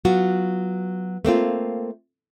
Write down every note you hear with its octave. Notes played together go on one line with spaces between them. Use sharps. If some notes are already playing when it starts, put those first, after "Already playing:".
F#3 B3 F4 F#4
A3 A#3 C4 F4